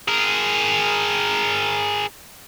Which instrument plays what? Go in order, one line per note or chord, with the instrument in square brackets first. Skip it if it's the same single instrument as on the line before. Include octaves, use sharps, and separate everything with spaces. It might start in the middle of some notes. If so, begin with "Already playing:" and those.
[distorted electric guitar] G#4 A#4